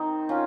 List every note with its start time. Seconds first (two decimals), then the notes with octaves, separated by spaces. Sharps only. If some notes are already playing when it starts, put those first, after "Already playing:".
Already playing: D#3 C4 D#4
0.29 C#4 F4